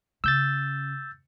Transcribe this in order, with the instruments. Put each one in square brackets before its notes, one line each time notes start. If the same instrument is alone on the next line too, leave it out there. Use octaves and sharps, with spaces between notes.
[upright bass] C#3 [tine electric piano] E6 G6 A6